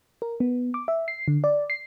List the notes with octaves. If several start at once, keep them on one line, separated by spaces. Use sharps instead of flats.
A#4
B3
D6
E5
C7
D3
D5
C7